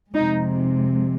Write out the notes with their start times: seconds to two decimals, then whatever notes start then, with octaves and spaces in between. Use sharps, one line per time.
0.14 F2 C3 G#3 D#4